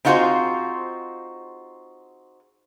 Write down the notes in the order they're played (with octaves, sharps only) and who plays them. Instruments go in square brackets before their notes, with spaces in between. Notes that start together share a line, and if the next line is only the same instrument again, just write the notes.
[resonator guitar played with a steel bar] C4 D#4 F4 F#4 G#4 C5